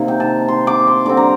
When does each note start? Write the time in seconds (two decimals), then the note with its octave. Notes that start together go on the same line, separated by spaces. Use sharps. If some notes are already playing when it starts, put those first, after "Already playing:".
Already playing: C3 D#3 A#3
0.08 G5
0.20 A5
0.48 C6
0.67 D6
0.87 C6
1.06 D3 G3 C4 D6
1.17 A#5